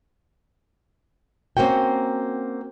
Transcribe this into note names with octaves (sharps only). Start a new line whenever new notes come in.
A#3 C4 C#4 F#4 G5